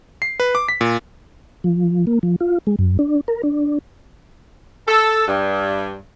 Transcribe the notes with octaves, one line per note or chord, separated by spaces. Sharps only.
C7
B4
D6
B6
A#2
F3
A#3
F3
F4
G#3
F#2
D4
A#4
D4
A4
G2